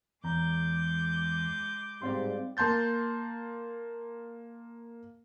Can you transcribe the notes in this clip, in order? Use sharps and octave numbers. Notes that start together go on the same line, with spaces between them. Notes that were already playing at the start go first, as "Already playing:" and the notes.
E2 G#3 A#5 D6 G6
G#2 G3 C4 D5 F5 C6
A#3 A5 C6 G6 A6